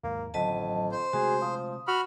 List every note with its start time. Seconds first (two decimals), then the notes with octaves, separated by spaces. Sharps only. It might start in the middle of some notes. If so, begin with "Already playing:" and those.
0.03 D#2 G#2 A#3
0.34 A1 F2 D3 D#3 F#3 D#5 A5
0.92 C5
1.13 C3 G#3 A3 F#4 G#4
1.41 F3 D#6
1.87 F#4 B5 F6